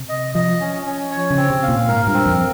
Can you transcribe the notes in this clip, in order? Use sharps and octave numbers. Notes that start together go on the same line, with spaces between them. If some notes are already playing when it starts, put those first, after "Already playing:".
Already playing: C3
D#5
F3 D#5
C#4
C#4
C#5
C#3
C4
C3
F5
A#2
G#2 A#4
G2
C4
F2